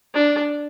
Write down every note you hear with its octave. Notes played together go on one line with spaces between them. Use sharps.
D4